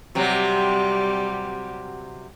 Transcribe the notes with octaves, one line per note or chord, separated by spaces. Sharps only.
C3 F#3 G3 G4